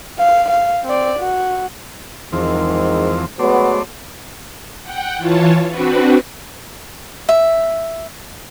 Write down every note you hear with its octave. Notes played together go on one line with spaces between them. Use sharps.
F5
F5
C4 D5
F#4
E2 G#2 D#3 F3 C4
F#3 G#3 A3 B3 C5 D5
F#5 G5
E3 F4 C#5 A5
C4 D4 F#4 B4
E5